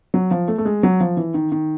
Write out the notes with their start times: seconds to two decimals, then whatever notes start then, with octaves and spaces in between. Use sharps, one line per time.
0.14 F#3
0.31 F3
0.48 A3
0.58 A3
0.65 G#3
0.83 F#3
1.00 F3
1.17 E3
1.34 D#3
1.52 D#3